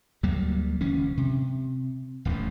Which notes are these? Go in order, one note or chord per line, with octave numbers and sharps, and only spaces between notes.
D2 F#3 G3 A#3
D#1 C#2 E3 C#4
C3
D1 A1 D#2 A3